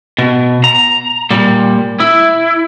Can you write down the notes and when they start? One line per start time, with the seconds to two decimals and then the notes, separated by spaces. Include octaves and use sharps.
0.18 B2
0.64 A#5
1.31 A#2 G3
2.00 E4